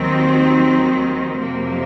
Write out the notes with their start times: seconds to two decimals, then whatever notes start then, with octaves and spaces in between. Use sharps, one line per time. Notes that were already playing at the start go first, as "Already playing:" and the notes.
Already playing: D#2 D#3 F#3 C4
1.38 F2 C3 F#3 A#3